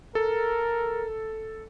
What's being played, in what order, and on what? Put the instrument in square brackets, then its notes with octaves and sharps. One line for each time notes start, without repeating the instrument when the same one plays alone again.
[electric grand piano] A4 [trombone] A#4